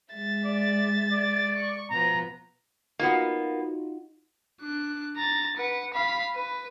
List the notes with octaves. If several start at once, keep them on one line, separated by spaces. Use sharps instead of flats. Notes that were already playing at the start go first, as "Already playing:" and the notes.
G#3 E5 A6
D5
D5
C#6
B2 F3 B3 A#5
A#3 B3 D#4 F4 F#4
D4 F#6
A#5 A6
B4 F#5
F5 B5
B4